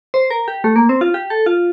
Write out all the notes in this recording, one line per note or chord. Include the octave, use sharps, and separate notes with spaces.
C5
A#4
G4
A3
A#3
C4
F4
G4
A4
F4